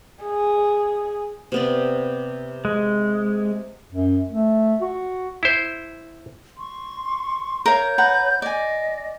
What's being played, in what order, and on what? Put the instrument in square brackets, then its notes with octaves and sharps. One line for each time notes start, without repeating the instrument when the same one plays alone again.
[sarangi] G#4
[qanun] C3 B3 D5
[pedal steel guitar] G#3
[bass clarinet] F#2
A3
F#4
[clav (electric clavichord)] E4 C5
[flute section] C6 C#6
[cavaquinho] A#4 F5 [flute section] C#5 G6
[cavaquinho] B4 F#5 A#5
[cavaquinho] D5 G#5 [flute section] D#5